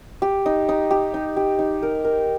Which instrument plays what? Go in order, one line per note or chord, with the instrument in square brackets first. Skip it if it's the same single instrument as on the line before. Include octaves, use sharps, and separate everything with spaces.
[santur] G4
D#4
D#4
G4
D#4
G4
D#4
A#4
A#4